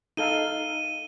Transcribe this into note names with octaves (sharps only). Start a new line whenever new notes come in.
D#4 A4 F5 D#7 G7